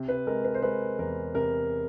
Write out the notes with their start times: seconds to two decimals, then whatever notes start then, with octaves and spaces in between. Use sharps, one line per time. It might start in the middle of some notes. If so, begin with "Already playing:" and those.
Already playing: C3
0.08 B4
0.27 G#3 A#4
0.45 B4
0.54 C5
0.62 G#3 B4
0.98 E2 A#4
1.35 C3 A#4